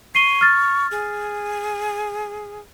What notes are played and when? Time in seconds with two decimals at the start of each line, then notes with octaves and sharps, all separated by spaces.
0.15 C#6 C7 D#7 G7
0.41 F6 A6
0.91 G#4